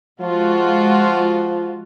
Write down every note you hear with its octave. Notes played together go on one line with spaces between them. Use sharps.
F3 G#3 F4 F#4